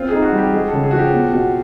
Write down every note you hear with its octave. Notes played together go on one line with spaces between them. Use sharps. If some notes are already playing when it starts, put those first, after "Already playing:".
Already playing: C4 F4
D#4 G#4
F#4
G3
G4
G#3 G#4
C#3 A4
G#4
F3 F#4
G4
B3
B2